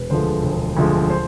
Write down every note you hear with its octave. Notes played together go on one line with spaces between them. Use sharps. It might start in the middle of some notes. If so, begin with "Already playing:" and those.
Already playing: E1 B4
D2 D3 F3 G#3 C5
E1
D2 D3 F3 G#3
C5